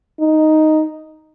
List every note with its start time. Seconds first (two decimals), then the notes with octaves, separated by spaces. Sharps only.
0.20 D#4